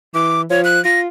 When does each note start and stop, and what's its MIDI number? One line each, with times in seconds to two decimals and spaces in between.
0.14 0.45 52
0.14 0.42 86
0.50 0.80 53
0.50 0.61 73
0.65 0.83 90
0.85 1.08 65
0.85 1.00 94